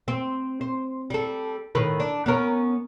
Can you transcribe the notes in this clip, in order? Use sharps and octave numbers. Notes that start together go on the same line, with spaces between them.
C4
C5
G3 A4
A2 D#3 B4
D4
B3 C#4 A#4